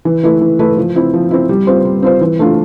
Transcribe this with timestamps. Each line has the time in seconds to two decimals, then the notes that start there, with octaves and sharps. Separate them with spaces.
0.05 E3
0.23 A3 E4 B4
0.41 E3
0.59 A3 E4 B4
0.77 F3
0.96 C4 E4
1.14 F3
1.31 C4 E4
1.49 G3
1.67 C4 F4 C5
1.85 G3
2.03 C4 F4 C5
2.21 E3
2.39 A3 D4 F4